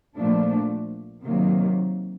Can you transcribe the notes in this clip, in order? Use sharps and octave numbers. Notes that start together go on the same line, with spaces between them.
A#2 F3 A3 D4
C3 D#3 F#3 A#3